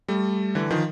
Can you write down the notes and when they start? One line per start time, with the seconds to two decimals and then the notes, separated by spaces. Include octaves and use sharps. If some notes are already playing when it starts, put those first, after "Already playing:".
0.08 G3 A3
0.55 D3 E3
0.70 D#3 F3